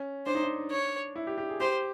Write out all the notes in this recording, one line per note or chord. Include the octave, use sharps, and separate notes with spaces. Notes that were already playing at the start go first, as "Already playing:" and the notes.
Already playing: C#4
D4 C5
D#4
D4
C#5
E4
G4
G4
G#4
G4 C5